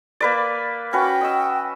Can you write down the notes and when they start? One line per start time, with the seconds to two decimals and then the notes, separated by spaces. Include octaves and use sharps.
0.20 A#3 B4 D5
0.93 C#4 F#4 B4 G5
1.21 D#5 E6